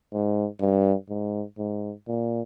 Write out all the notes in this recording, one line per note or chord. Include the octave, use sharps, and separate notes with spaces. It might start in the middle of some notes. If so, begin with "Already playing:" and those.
G#2
G2
G#2
G#2
A#2